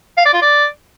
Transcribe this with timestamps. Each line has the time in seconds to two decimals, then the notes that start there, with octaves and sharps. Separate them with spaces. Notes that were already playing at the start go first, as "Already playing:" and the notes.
0.17 F5
0.26 D5
0.34 F4
0.42 D5